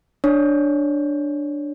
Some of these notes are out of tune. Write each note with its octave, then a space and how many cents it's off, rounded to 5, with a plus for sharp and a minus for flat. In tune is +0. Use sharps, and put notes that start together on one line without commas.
D4 +0 C#5 +0